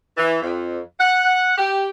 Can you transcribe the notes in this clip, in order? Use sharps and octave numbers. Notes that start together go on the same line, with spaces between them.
E3
F2
F#5
G4